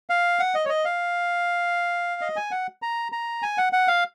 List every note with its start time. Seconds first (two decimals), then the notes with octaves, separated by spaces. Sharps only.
0.10 F5
0.39 F#5
0.55 D#5
0.65 C#5
0.69 D#5
0.85 F5
2.21 D#5
2.36 G#5
2.51 F#5
2.82 A#5
3.12 A#5
3.42 G#5
3.58 F#5
3.73 F#5
3.88 F5